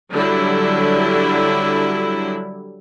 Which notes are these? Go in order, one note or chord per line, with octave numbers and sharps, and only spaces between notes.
D3 F#3 G3 E4